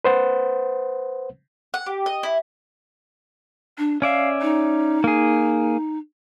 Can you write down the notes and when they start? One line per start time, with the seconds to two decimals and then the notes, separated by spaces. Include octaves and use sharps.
0.05 B4 C5 F#5
1.74 F#5
1.86 G4
2.06 D#5
2.23 E4
3.78 D4
4.02 C#4 D5 E5 F5
4.42 D#4
5.04 A#3 G#4